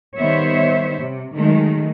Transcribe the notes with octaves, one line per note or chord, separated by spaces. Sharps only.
D#3 G3 B3 C5 C#5 E5
C3
D#3 F#3 G#3 A3